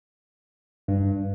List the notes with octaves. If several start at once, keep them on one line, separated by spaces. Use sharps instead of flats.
G2